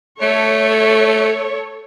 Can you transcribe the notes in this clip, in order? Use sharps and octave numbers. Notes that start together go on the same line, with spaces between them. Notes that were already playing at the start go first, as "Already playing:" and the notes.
A3 A4 C#5